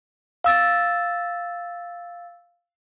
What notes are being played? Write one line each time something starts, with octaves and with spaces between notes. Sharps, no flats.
F5 E6 A6